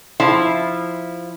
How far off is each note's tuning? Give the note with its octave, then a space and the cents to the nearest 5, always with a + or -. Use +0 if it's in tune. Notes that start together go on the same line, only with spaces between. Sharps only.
F3 -10 E4 -10